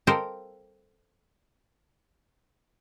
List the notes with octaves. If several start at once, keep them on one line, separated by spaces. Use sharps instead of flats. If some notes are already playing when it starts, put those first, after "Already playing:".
A4 A#4 C5 D#5 F5 G5